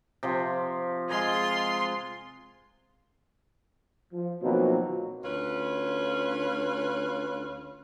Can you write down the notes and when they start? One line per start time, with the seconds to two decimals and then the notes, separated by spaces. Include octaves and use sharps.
0.23 C3 F3
1.09 G#3 F4 G#5 C6
4.13 F3
4.42 B2 D#3 F3 F#3 A#3 C4
5.24 D2 C#4 F4 B4